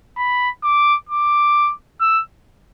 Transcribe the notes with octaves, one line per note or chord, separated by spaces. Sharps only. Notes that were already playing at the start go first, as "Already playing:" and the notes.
B5
D6
D6
E6